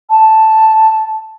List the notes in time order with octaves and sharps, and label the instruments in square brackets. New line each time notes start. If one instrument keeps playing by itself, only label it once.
[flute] A5